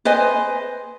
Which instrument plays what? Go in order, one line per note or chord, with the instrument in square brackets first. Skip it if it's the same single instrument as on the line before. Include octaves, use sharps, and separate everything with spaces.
[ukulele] B4 C5 D#5 G#5